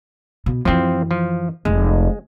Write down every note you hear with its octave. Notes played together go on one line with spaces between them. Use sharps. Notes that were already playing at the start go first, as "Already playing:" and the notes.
B2
F#2 E3 F3 C4
F3
F1 G#3